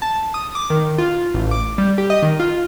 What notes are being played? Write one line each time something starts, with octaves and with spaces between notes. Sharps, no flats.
A5
D#6
D6
D#3
F4
A1
D6
G3
G4
D#5
D#3
F4